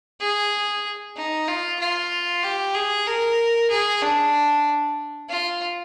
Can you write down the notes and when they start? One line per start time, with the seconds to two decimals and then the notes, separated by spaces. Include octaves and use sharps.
0.21 G#4
1.16 D#4
1.48 F4
1.80 F4
2.43 G4
2.75 G#4
3.07 A#4
3.71 G#4
4.02 D4
5.30 F4